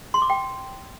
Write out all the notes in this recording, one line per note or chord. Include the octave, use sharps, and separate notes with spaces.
C6
D6
G5